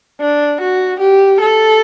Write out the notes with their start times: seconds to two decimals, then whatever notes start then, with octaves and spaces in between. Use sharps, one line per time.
0.21 D4
0.61 F#4
1.00 G4
1.41 A4